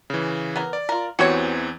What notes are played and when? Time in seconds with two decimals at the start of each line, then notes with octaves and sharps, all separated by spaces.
0.10 C#3 E3
0.56 B3 A#4
0.73 D5
0.89 F4 A#4
1.19 E2 E3 C4 F#4 G4 C#5